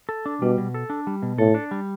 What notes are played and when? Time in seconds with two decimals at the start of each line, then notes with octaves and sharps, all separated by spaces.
0.09 A4
0.26 D4
0.41 B2 G3
0.58 B2
0.74 A4
0.90 D4
1.07 G3
1.22 B2
1.38 A2 A4
1.54 D4
1.71 G3